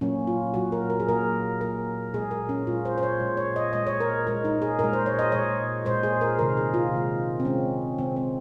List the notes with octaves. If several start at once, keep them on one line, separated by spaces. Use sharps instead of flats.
A#2 F#3 A#3 C#4
F4
A#2 F#3 A#3 F#4
A#4
A#4
G#4
A#2 F#3 A#3 A#4
A#2 F#3 A#3 A#4
A#2 G#3 G#4
A#4
C#4
A#2 G#3 F4
C5
C5
C#5
A#2 G#3
C#5
D#5
A#2 G#3 D#5
C#5
A#4
A#2 G#3 A#4
D#4
G#4
A#2 G#3 A#4
C5
C#5
D#5
A#2 G#3 C#5
A#2 G#3 C5
G#4
A#4
C3 D#3 G#3 A#4
G#4
F4
C3 D#3 G#3
C4
C3 D#3 G#3 C#4
C3 D#3 G#3 C4
C4